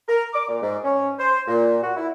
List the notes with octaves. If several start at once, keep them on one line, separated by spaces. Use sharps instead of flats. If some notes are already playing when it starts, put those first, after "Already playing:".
A#4
D6
A#2
G#2
C#4
C5
A#2
F#4
E4